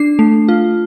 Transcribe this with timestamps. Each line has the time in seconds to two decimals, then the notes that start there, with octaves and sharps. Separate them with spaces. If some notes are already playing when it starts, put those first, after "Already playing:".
Already playing: D4 C7
0.19 A3
0.49 F4